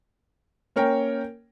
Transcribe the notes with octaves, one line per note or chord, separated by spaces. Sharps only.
A#3 C#4 A#4 C#5 G5